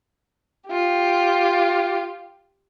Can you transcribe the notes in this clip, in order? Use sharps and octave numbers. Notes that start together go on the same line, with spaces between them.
F4 G4